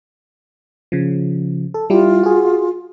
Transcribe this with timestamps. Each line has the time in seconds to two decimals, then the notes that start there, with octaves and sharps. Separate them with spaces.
0.92 C#3 F3
1.74 A4
1.90 G3 E4 F4 G4
2.23 F#4 G#4